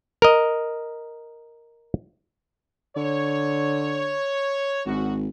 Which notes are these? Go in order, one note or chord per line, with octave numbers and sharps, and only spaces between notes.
A#4 D#5
D3 C#5
G#1 F#2 F#4